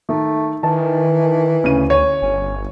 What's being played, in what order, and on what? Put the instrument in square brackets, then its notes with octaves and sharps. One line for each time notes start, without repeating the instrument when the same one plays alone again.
[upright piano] D#3 [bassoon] A3
[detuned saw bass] D#3 [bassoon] E3 [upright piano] A5
[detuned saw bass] D2 [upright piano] C#3 D#7
[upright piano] C#5
[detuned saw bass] G1 [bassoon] C#4